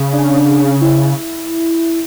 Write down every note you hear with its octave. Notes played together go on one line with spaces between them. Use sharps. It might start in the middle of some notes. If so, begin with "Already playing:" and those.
Already playing: C#3
D4
D4
E4
E4